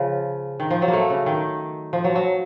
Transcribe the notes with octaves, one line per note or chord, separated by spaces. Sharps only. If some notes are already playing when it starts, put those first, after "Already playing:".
Already playing: C#3 F3
D#3
F3
F#3
A#3
A3
C#3
D#3
F3
F#3
F#3